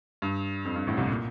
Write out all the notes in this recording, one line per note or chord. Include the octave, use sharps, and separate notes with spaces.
G2
F2
G2
A1 A2
C2 C3
A#2